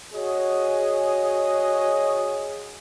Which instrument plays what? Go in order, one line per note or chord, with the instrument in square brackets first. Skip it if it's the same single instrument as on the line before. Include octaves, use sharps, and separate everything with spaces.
[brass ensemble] F#4 G#4 C#5 D#5